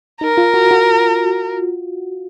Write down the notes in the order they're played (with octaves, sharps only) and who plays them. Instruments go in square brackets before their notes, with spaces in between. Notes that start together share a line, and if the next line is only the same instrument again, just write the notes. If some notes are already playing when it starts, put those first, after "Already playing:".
[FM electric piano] D#4 [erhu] A#4
[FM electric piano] F4
F#4
F#4